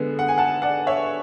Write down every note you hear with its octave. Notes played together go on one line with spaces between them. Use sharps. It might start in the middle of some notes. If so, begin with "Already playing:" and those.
Already playing: D3 G#3 B3
F#5
G#5
F#5 A5
D5 F#5
C#5 E5